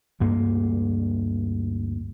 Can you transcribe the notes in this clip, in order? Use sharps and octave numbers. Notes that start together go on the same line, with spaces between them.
D2 G2 A#3